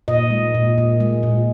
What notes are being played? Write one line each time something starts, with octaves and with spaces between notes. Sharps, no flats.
A#2 D#5
G#3
A#2
A#2
G#3
A#2